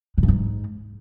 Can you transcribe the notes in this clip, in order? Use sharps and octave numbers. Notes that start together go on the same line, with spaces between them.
D3
G2
G#2